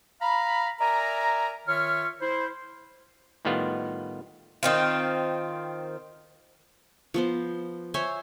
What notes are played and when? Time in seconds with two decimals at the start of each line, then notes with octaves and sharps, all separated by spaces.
0.21 F5 A#5 B5
0.80 A#4 D5 E5 G#5 A#5
1.67 D#3 F4 C#5 E5 C#6 F6
2.21 E4 C5
3.45 A2 D#3 G3 B3 F4
4.63 D#3 C4 F4
7.14 F3 B3 C5
7.94 C5 C#5 E5 G#5